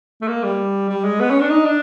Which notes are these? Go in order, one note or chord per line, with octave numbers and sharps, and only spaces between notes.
A3
A#3
G3
G3
G#3
B3
C#4
D4
D#4
D4